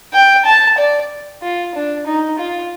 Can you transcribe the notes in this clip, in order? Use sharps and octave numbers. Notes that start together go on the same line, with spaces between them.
G5
A5
D5
F4
D4
D#4
F4